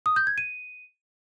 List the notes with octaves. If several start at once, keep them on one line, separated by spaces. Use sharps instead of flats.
D#6
G6
G#6
D#7